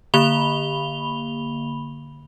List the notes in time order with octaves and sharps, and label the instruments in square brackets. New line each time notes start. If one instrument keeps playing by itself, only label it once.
[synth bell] D3 A#3 B5 F7 G7